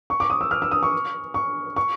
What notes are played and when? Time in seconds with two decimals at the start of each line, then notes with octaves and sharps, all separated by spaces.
0.10 C#6
0.20 D6
0.30 D#6
0.41 E6
0.51 F6
0.62 E6
0.71 D#6
0.83 C#6
1.34 C#6
1.76 C#6